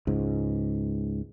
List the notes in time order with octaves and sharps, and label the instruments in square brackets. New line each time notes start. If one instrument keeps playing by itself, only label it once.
[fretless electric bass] C#2 G#2